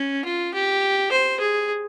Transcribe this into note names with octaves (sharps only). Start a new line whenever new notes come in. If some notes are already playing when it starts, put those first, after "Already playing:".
Already playing: C#4
F4
G4
C5
G#4